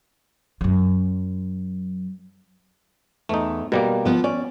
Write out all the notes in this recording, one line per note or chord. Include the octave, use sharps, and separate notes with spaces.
F#2 F#3
E2 A3 D#4
B2 G3 A#3 A#4
F3 B3
C#4 D5